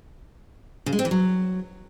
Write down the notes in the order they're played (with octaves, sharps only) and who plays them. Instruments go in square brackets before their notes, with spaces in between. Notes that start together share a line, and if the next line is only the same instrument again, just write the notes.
[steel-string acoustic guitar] C#3
G#3
C4
E3
F#3